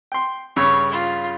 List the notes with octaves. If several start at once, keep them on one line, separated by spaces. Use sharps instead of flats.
G5 C6
G2 C#3 C#5 E6
F4